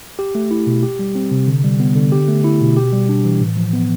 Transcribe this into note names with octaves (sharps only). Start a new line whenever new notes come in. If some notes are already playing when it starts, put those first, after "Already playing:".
G4
A3
E4
B2
G4
G3
C4
C3
D3
G3
B3
D3
G4
A3
E4
B2
G4
G3
D4
E3
A2
F3
B3